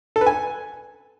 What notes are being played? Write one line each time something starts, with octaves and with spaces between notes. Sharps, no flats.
A4
B4
G#5